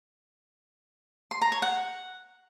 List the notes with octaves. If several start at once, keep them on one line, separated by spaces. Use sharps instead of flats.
C6
A#5
C#5
F#5